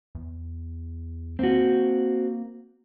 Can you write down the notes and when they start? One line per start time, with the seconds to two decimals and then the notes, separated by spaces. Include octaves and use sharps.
0.15 E2
1.39 A#3 C4 F#4